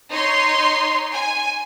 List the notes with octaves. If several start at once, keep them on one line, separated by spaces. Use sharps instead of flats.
D#4 C#5 C6
G#5